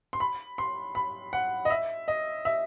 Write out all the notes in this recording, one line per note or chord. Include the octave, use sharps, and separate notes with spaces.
C6
B5
C6
B5
F#5
D#5
E5
D#5
E5